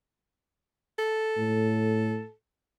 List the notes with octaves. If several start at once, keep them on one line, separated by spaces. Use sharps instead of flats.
A4
A2